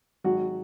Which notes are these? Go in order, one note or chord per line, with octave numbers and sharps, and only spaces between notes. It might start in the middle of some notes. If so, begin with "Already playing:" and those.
G#1 F#3 F#4